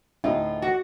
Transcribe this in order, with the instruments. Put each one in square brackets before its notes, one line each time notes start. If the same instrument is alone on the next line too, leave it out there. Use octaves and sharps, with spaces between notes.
[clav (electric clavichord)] D2 A2 G#4 [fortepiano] D#4 [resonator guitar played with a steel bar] F4
[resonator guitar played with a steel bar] F#4